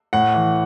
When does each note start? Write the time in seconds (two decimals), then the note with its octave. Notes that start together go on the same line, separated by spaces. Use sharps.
0.13 A2 F#5
0.34 E3